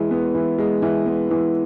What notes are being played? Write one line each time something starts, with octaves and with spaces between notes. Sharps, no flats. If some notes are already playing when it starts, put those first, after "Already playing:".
Already playing: E3 G#3
B3
E3
G#3
E3
B3
E3